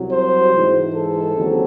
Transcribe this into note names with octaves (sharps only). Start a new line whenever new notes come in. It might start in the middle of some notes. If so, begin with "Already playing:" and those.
Already playing: C2 C3 F#3
C5
G#2 E3 G#3
A4
D#2 C#3 F#3 C4